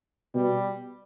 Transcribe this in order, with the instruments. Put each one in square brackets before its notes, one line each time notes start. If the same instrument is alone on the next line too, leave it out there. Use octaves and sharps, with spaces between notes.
[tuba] B2 [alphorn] G3